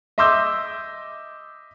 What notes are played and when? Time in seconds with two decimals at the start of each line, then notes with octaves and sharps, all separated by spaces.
0.18 D#5 E5 C6 D6 E6 G6